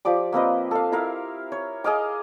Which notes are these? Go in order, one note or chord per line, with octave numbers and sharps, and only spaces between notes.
F3 G4 D5 D6
A#3 C4 B4 D#5
A4 F5
E4 A#4 E5 F5
C#5
G#4 D#5 F5 D6